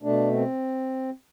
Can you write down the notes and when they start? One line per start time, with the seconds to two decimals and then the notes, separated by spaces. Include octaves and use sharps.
0.03 B2 A3 D4
0.32 C4